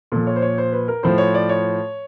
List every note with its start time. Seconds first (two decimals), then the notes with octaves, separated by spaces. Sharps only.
0.12 A#2 F3 A4
0.27 C#5
0.36 C5
0.42 C#5
0.58 C5
0.72 B4
0.88 A#4
1.03 A2 F3 C5
1.18 C#5
1.34 D5
1.49 C#5